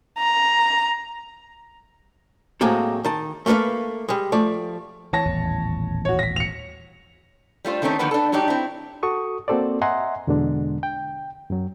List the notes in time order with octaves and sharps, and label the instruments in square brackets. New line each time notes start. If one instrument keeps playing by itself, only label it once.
[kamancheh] A#5
[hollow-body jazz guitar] A2 F#3 G#3 A#3 C4 A4
D#3 A5
A3 A#3 A4 B4 F5
G3 G#3
F3 A3 D5
[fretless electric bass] E3 [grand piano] C#5 A5 A#6
[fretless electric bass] D#1 A1 E2
[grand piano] F#4 C#5
A#6 B6
C#7 F7
[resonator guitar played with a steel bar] G3 A3 F4 C5
D#3 A3 C4 C#4 D#4
D3 D#3 F3 A#3 B3 B4
D4 A4
F#3 G#3 D4 D#4 G4
C4 E4
[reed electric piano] F#4 A4 C#6 D#6
A#3 C4 F#4 A4 C5 D5
D#5 E5 F#5 G#5 A#5 C6
E2 B2 D3 G#3 D4
G5
F#2 F#3